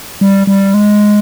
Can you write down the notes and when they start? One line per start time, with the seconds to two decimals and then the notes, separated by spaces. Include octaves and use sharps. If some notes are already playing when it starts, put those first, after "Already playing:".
0.21 G3
0.47 G3
0.74 G#3